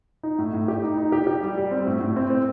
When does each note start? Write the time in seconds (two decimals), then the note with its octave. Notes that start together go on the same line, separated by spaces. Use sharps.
0.23 D#4
0.39 A2
0.53 A2
0.68 G4
0.84 D#4
0.98 D#4
1.12 G4
1.27 G4
1.43 G3
1.57 G3
1.71 C4
1.87 A2
2.01 A2
2.16 C4
2.30 C4